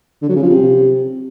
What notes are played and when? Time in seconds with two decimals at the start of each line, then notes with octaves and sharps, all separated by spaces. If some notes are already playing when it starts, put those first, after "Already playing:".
0.22 D3
0.29 F#3
0.36 C#3
0.43 F3
0.50 C3